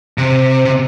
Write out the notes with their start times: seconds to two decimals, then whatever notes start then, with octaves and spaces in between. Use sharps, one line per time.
0.18 C3
0.65 C3